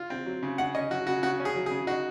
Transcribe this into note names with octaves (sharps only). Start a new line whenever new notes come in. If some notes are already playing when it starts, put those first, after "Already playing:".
Already playing: F4
C4
F#3
C#3
C#3 F#5
C#4 D#5
F#3 F#4
C#3 F#4
C#3 F#4
C#4
G#4
F#3
G#4
C#3
D#4 F#4